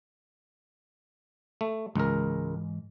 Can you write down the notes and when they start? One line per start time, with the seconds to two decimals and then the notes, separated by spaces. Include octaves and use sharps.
1.61 A3
1.96 C#2 G#2 E3 A#4 D#5